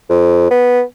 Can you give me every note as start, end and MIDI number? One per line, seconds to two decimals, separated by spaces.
0.09 0.48 41
0.51 0.81 59